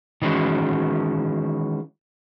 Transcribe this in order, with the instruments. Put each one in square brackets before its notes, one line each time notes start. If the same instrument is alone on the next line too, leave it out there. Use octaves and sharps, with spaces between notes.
[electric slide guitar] D#3 E3 G#3 C#4 F#4